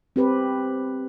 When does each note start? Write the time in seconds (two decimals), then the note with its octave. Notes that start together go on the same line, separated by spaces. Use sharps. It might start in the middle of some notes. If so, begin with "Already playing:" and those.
0.16 C4 G4 B4